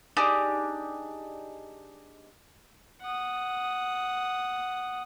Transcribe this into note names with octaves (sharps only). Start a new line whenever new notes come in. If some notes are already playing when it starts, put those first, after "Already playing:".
D4 D#4 G4 G#4
F#5 D#6